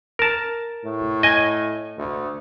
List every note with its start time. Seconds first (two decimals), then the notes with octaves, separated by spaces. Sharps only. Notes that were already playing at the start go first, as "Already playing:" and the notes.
0.19 A#4 A5
0.85 A2
1.23 D#5 G#5
1.98 D2